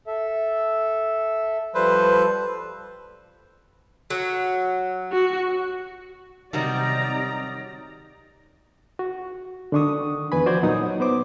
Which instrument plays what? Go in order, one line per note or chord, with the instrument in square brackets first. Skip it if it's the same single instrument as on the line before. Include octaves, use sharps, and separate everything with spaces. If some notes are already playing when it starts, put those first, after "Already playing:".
[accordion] A4 E5
[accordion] F3 G3 A4 [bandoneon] B4 C5
[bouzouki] F#3
[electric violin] F#4
[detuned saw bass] C3 [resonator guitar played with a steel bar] D#3 F#3 G3 [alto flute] D#4 [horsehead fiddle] D5 A#5
[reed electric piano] F#4
D3 D#3 D4 C#6 D#6
E2 B4 G#5 B5
F3 F#4 C5 D5 G6 G#6
A#2 F#3 D#4 C#5 F#5 D#6
B3 C5 D6